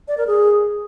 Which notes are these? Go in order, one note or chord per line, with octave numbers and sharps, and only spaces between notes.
D5
A#4
G#4